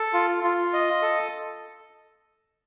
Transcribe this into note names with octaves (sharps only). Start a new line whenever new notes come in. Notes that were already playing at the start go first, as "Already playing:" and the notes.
Already playing: A4
F4
F4
D#5
A4